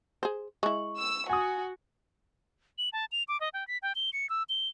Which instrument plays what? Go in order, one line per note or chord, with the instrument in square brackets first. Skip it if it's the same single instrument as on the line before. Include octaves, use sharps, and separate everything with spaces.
[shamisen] G#4 C5
[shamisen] G#3 E4 [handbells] C#6
[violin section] E6
[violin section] F#4 [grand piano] G#5 D#6
[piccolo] F#7
A5
F7
D6
D#5
G5
B6
G5
G7
C#7
E6
G7